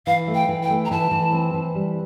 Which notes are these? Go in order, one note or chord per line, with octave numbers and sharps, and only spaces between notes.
E3 F5
A3
G5
E3
G5
A3
A#5
E3 A5
E3
C4
E3
G3